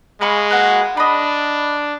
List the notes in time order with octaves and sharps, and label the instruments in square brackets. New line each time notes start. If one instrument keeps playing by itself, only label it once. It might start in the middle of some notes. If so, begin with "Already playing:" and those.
[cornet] G#3 [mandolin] F5 B5 C#6
[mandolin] A#3 F#4 B4
[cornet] D4 [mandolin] D#5 B5